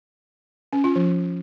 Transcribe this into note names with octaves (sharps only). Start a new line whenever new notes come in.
C#4
F4
F3